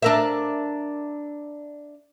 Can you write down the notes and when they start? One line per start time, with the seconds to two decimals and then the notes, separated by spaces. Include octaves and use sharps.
0.02 D4 A#4 E5